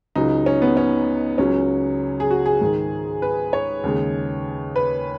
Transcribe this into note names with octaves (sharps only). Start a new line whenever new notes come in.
C#2 C#3 F#3 D#4
C#4
B3
C#4
C#2 C#3 F#3 C#4
G#4
F#4
G#4
G#2 D#3 G#3
B4
C#5
D#2 C#3 G#3
B4